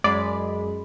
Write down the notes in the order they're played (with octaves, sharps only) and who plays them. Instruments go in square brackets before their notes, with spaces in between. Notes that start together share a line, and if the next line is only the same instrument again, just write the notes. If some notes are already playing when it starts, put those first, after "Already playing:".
[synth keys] F#2 G#3 B5 [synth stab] D5